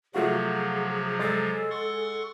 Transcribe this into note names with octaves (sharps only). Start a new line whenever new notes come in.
C3 F3 F#3 A3 F4 F#4 G#4
G#3 A4 A6 C7
F#5 C6 C#6